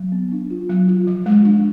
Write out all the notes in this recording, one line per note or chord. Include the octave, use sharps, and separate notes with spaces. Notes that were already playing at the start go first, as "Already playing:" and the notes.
Already playing: F#3
B3
D4
F4
F#3
F4
F3
G#3
D4